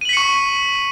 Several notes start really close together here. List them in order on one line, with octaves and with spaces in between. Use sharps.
D#7 F#7 B6 C#7 C#6